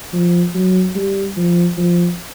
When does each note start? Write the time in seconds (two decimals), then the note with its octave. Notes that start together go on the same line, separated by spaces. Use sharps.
0.13 F3
0.54 F#3
0.95 G3
1.36 F3
1.77 F3